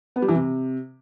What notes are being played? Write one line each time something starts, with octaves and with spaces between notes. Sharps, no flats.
B3
G3
E3
C3